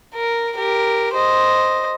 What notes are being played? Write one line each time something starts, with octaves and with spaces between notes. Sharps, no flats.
A#4
G4 A#4
C5 D#5